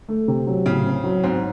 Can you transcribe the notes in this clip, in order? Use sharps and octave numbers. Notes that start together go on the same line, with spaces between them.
A3
C3
F#3
A2 C#3
C4
F#3
G#2 C4